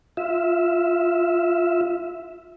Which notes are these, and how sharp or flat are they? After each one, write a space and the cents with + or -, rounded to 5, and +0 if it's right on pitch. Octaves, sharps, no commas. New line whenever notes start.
F4 +0 E5 +0